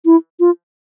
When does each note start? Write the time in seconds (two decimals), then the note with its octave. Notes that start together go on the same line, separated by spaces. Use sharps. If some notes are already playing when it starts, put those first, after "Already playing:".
0.05 E4
0.40 F4